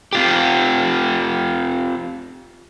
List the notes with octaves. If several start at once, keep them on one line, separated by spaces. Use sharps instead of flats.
C4 F4 G4